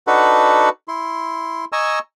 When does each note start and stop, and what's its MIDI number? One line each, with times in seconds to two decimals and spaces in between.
0.07 0.69 62
0.07 0.69 63
0.07 0.69 66
0.07 0.69 69
0.07 0.69 71
0.07 0.69 78
0.88 1.65 64
0.88 1.65 84
1.72 1.99 75
1.72 1.99 80
1.72 1.99 82
1.72 1.99 85
1.72 1.99 88